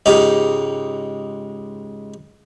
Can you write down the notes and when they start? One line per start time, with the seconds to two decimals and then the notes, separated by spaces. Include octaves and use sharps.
0.06 C#2 G#2 D#4 G4